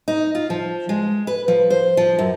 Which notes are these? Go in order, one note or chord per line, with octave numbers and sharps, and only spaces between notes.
D#4
F4
F3
G#3
B4
F3
C5
F3
F#2